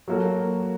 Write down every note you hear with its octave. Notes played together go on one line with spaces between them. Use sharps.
F#3 A#3 F#4 A4